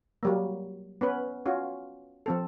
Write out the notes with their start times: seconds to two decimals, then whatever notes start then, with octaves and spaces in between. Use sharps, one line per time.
0.23 F#3 G3 A#3
1.01 B3 C#4 B4
1.46 C#4 F4 F#4
2.26 F3 C4 A4